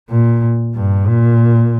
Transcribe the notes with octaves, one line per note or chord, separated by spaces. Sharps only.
A#2
G2
A#2